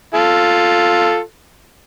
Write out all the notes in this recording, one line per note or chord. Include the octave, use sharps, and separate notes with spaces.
F4 A4